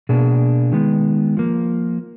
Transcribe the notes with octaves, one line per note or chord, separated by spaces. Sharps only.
B2 A#3 D4 G#4
D#3 G#3 B3
F3 A#3